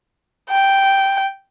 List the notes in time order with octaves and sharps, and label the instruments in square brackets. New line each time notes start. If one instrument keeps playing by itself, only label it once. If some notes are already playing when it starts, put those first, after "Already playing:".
[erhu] G5